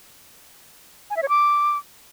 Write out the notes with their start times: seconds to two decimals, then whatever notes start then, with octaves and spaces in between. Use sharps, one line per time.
1.10 G#5
1.17 E5
1.23 C#5
1.29 D6